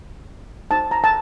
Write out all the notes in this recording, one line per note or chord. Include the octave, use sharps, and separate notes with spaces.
D#4 F#4 C5 A5
A#5
A5